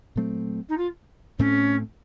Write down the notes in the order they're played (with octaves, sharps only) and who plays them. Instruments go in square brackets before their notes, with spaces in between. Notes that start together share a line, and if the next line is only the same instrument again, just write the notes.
[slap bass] A#2 F#3 A3 C4
[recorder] D#4
F4
[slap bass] A2 A3 C4 [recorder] C#4